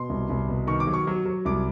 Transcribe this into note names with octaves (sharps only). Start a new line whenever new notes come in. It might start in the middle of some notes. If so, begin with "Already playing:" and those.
Already playing: B2 C6
C2
C2
B2
D#3 C#6
D6
F#3
C#6
F#3
F#3
C2 D6